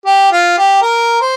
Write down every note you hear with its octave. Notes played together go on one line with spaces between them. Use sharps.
G4
F4
G4
A#4
C5